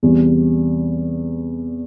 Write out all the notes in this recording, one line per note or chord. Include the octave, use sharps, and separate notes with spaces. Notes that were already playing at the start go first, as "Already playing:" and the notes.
E2 C3 G3